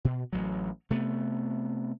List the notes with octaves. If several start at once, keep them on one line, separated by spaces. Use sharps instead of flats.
B2
A1 F#3
C3 A3 B3